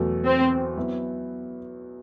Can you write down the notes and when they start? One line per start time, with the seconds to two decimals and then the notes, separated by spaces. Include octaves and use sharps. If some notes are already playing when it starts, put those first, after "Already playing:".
Already playing: E2 B2 F#3 A3
0.26 C4
0.77 F#3 B3 E4